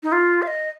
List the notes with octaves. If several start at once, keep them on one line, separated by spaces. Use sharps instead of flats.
D#4
F4
F5
D#5